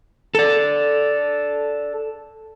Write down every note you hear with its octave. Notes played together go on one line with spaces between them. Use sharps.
A4 D5